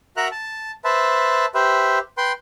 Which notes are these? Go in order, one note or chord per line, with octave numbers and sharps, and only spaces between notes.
F#4 A#4 E5 A#5 F#6
A5
B4 C5 E5 A5
G4 B4 C5 E5
B4 G5 C6